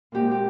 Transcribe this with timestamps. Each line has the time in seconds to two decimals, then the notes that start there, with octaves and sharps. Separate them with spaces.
0.12 A#2 G#3 C4 G4
0.31 G4